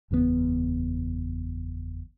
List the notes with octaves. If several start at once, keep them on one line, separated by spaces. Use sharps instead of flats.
F#1 E2 A2 B3